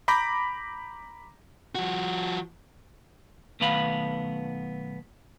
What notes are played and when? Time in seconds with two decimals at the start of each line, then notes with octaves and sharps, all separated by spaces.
0.08 A#5 B5 D6 G6 A#6
1.75 F3 F#4
3.60 B1 D#3 A3 B3 F5 B5